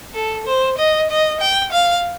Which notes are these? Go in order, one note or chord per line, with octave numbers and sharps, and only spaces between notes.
A4
C5
D#5
D#5
G5
F5